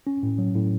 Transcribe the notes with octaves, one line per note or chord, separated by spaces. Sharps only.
C#4
A2
F#3
A2